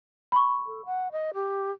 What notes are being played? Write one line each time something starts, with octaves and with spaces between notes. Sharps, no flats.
B5 C#6
A4
F#5
D#5
G4